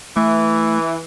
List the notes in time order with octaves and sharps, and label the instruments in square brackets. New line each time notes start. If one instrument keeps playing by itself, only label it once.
[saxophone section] E3 [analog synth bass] A3